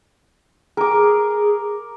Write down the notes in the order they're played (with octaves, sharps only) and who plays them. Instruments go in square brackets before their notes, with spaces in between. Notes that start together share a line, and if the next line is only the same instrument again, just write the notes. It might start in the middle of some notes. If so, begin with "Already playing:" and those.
[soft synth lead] G#4 [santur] A#4 D6